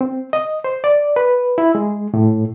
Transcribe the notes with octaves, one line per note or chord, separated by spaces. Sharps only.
C4
D#5
C5
D5
B4
E4
G#3
A2